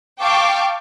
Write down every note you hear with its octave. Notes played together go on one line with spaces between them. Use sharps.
F5 G5 A5 C#6 D6